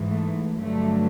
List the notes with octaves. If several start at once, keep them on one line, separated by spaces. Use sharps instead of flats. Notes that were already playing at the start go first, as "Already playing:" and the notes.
Already playing: G#2 E3
A3
G2 D3 F#3 A3